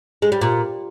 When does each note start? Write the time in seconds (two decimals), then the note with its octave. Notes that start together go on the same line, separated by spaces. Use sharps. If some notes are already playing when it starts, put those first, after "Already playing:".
0.22 G#3
0.32 G3
0.41 A#2